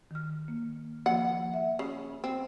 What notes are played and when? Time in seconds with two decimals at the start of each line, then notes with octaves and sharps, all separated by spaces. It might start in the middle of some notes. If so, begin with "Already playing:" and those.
0.11 D#3 F6
0.48 A#3
1.06 F3 A#3 F#5
1.54 E5
1.79 C#3
2.24 C4